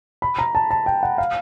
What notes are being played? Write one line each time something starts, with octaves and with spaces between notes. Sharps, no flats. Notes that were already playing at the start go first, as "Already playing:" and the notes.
B5
A#5
A5
A5
G5
F#5
F5